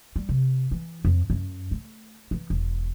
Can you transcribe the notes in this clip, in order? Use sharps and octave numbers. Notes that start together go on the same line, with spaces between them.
G3
C3
E3
F2
F#2
A3
E3
E1